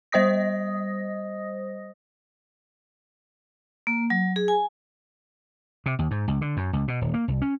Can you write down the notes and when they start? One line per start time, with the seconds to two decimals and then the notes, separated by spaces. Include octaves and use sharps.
0.12 G3 C5 D#5 D#6 A#6
3.87 A#3
4.10 F#3
4.36 G#4
4.48 G#5
5.86 C3
5.99 D#2
6.11 G#2
6.28 C#2
6.41 D3
6.57 F#2
6.73 C#2
6.88 B2
7.01 D#1
7.14 A#3
7.28 C2
7.42 C#4